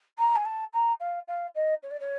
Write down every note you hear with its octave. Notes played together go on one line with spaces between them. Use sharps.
A#5
G#5
A5
A#5
F5
F5
D#5
C#5
D5
C#5